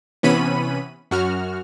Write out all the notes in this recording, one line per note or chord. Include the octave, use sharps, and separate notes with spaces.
C3 E3 B3 C#4 B5 D#7
F#2 F#4 F6